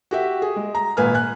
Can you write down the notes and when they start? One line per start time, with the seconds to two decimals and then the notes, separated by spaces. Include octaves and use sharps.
0.11 F#4 G4 E5
0.42 G#4
0.56 G#3
0.75 A#5
0.97 G#1 A#2 B4 G#5 F6
1.14 G#5 F#6